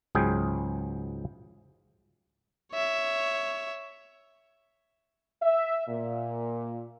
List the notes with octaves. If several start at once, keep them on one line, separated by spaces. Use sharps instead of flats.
C#2 G#2 F#3 G#4 G5
C#5 E5
E5
A#2